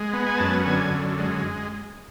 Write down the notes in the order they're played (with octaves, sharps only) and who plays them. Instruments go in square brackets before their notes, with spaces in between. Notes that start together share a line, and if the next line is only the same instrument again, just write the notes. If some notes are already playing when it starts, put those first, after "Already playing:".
Already playing: [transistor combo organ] G#3
B3
G#5
F#2 A5
G#5
D3 G#5
F#2
G#3